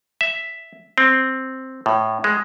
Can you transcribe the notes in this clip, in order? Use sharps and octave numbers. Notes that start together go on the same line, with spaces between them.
E5
C4
A2
G#3